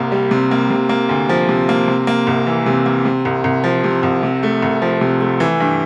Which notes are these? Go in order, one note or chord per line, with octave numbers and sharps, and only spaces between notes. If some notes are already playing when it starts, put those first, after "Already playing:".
Already playing: C2 C3 A#3
G3
C3
A#3
C3
A#3
D2
F3
C3
A#3
C3
A#3
C2
E3
C3
A#3
C3
C2
C2
F3
C3
C2
C3
A3
C2
F3
C3
A3
E3
G2